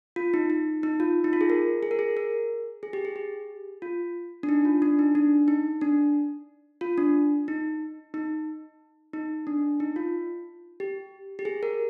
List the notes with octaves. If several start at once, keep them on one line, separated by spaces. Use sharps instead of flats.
F4
D#4
D#4
D#4
F4
D#4
F4
G#4
A#4
G#4
A#4
G#4
A#4
G#4
G4
G#4
G4
F4
D4
D#4
F4
D4
D#4
D4
D#4
D4
F4
D4
D#4
D#4
D#4
D4
D#4
F4
G4
G4
G#4
A#4